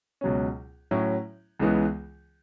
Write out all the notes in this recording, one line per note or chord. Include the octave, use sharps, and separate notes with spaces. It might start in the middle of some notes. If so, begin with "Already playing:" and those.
C#2 B2 F#3 C#4
A2 F#3 C#4 E4
C#2 C#3 E3 G#3 B3